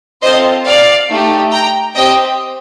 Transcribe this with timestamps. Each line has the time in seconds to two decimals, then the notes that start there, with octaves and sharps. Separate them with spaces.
0.22 C4 F4 A4 C5 D#5
0.65 D5 F5
1.09 A3 D#4 G4
1.51 G5 A#5
1.95 C4 G4 D#5 G5